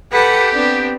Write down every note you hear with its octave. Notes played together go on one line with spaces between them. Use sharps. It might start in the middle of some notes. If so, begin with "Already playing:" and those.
G4 A4 B4 F#5
B3 C4 D4